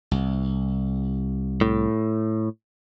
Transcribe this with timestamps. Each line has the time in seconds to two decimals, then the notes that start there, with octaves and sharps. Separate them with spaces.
0.11 C2
1.61 A2